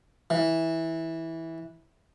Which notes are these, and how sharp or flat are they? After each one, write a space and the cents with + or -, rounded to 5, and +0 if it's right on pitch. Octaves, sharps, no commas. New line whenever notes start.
E3 -15